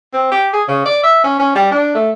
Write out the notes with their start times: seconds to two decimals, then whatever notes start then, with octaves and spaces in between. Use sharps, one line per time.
0.14 C4
0.32 G4
0.53 G#4
0.68 C#3
0.86 D5
1.03 E5
1.24 C#4
1.39 C#4
1.55 G3
1.71 D4
1.95 A3